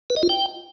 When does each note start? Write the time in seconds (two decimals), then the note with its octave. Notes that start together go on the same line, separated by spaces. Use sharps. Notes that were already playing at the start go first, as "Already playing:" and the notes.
0.10 B4
0.16 D#5
0.23 F4
0.29 G5